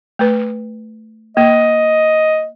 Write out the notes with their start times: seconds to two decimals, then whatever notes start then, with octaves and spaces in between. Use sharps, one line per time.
0.19 A3 B4
1.37 A#3 D#5